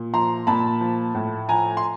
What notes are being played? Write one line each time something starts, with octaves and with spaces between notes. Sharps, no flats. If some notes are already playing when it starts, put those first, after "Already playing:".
Already playing: A#2
F3 A#5 C6
A#2 A5 B5
F3
A2
F3 G#5 A#5
C6